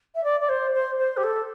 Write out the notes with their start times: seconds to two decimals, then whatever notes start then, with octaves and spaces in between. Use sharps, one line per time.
0.15 E5
0.24 D5
0.40 D5
0.49 C5
0.73 C5
0.98 C5
1.17 G4
1.23 A4